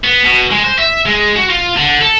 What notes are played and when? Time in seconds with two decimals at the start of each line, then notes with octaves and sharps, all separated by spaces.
0.04 B3
0.24 B2
0.51 G#3
0.64 C5
0.78 E5
1.06 G#3
1.36 F#4
1.50 F4
1.77 D3
2.01 A4